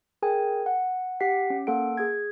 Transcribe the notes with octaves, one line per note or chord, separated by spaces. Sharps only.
G#4 A#4 G5 G#5
F#5
G4 F#5 B6 C7
C#4
A#3 A4 F#5 D7
G#4 G#6